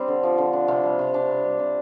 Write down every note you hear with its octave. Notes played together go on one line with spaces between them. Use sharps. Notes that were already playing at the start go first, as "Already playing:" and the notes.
Already playing: G3 C4 D4 G4
D3
F3
D3
D4
C3
G3
C3
D4
C3
G3
C3